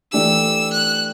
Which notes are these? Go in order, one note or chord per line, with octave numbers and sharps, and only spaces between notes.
E3 A3 D4 G4 E6
F#6